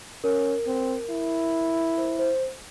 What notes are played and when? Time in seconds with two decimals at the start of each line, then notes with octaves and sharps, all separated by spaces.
0.24 C#4 A#4
0.66 C4
1.10 E4
1.98 C5
2.19 C5